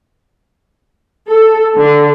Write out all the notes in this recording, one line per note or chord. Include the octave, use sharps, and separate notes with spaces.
A4
D3